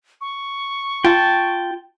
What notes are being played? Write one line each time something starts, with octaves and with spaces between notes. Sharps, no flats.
C#6
F4 G5 A5